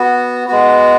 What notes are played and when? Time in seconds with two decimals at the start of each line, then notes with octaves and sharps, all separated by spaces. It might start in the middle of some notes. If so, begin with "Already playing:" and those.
Already playing: B3 F#4
0.48 G#3 B3 F#4